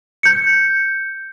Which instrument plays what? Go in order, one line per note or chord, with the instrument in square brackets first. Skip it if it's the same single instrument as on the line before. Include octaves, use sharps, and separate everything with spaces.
[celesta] G6 C#7